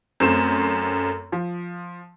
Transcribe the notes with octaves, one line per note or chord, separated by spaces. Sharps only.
F#2 A3 C4 E7
F3